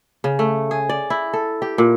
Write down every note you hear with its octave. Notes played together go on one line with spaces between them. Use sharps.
C#3
A3
G#4
D5
E4
A4
G4
A#2